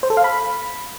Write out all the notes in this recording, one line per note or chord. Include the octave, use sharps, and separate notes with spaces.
C5
A4
F5
B5